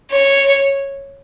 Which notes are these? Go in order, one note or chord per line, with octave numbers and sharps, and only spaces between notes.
C#5